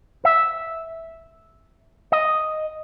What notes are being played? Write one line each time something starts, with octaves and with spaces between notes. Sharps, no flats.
E5
D#5